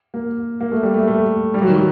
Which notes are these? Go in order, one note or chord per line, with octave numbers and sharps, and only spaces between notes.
A#3
A#3
A3
G3
A3
A3
G3
F#3
D#3
F#3